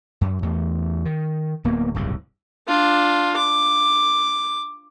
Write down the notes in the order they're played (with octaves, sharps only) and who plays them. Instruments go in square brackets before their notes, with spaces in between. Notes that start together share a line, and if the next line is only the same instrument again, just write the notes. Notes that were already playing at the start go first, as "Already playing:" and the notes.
[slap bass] F#2
E2 A3
D#3
D1 A#3 B3
D1 G1 C2 C#3
[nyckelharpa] D4 F4
D6